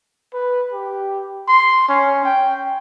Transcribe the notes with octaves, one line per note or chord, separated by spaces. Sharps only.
B4
G4
C6
C#4
G5